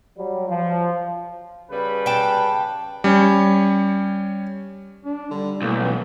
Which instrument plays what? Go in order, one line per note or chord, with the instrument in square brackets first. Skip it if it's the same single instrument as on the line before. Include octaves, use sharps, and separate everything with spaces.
[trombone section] F#3 G3
F3
[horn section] C#3 G3 B4
[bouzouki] G5 A5
[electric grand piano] G3 C#4 C#5
[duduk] D4
[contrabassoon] D3 [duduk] G3
[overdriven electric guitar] B1 [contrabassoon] A2 [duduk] A#3
[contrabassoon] C#2 [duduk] E3